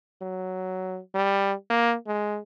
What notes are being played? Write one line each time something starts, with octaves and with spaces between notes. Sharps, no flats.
F#3
G3
A#3
G#3